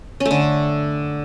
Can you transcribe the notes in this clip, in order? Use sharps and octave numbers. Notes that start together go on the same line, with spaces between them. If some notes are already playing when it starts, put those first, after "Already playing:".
C#4
A3
D3